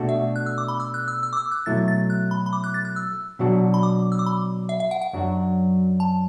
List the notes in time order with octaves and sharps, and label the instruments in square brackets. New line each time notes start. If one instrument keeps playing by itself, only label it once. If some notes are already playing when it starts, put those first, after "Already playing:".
Already playing: [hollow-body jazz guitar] B2 A3 D4 F#4
[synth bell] E5
F#6
E6
D6
B5
E6
F#6
E6
E6
D6
E6
F#6
[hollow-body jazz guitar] B2 F#3 A3 E4 [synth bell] A6
[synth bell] A6
F#6
B5
B5
D6
F#6
A6
F#6
E6
[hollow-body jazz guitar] B2 F#3 D4 F#4
[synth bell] B5
D6
E6
D6
B5
E5
E5
F#5
F#5
[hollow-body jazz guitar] F#2 F#3 D4 F#4
[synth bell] A5